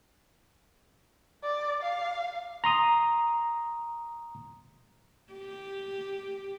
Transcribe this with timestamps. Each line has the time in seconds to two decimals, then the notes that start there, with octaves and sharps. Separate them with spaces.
1.44 D5
1.82 F5
2.64 A#5 C6 D#6
5.33 G4